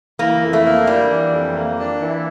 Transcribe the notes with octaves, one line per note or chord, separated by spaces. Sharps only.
E3 A#3
F2
A3
A#3
G3 D4
E3
F2
A#3
D4
E3